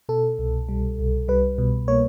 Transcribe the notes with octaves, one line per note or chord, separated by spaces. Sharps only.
B2 A4
C2
G3
C2
G3 B4
B2
A#3 C#5